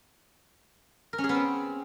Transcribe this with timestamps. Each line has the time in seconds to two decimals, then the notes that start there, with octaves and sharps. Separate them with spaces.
1.13 A#4
1.18 C#4
1.24 G#4
1.29 B3
1.35 C4